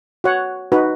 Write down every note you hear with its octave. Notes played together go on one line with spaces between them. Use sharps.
F#4 C#5 F#5
D#4 F#4 B4